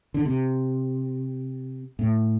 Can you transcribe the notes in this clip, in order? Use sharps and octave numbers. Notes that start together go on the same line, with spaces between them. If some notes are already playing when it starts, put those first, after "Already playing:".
D3
C3
A2